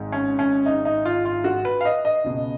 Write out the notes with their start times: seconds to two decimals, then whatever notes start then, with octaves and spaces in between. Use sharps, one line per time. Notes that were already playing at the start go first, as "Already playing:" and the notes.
Already playing: G#1 G#2
0.12 C#4
0.39 C#4
0.66 D#4
0.85 D#4
1.05 F4
1.25 F4
1.44 F#4
1.65 B4
1.81 F5
1.85 D#5
2.05 D#5
2.24 C#2 B2